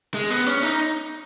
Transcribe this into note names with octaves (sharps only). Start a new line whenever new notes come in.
G#3
B3
C#4
D#4